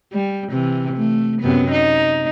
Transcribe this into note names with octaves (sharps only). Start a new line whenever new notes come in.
G3
C3 E3
A3
F#2 C3 B3
D#4